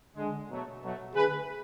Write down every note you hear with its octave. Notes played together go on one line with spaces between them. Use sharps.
D3 G#3
B2 F#3 A3
B2 F#3 A3
D3 A3 G#4 B4